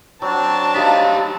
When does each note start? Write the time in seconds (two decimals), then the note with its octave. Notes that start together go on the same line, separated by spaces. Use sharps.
0.22 F#3 C4 D4 A5
0.76 D#4 G4 F5